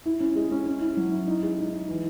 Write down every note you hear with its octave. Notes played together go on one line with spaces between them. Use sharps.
E4
C#4
G#3
C#4
C#4
E4
F#3
E4
D#4
G#3
D#4
D#4
E3